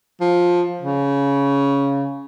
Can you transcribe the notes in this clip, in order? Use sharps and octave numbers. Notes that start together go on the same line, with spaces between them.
F3
C#3